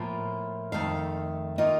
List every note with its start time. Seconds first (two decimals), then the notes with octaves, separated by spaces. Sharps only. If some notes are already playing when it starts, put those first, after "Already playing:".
Already playing: A2 F3 A#3 F4
0.72 F2 D#3 A3 F5
1.58 D#3 A#3 F4 D#5